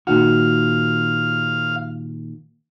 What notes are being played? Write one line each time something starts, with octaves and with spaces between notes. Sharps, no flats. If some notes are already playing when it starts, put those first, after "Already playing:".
A#2 D#3 F#4 F5